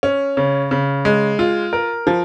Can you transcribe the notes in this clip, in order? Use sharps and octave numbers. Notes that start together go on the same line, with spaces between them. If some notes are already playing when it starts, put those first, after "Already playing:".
C#4
C#3
C#3
G#3
F4
A#4
F3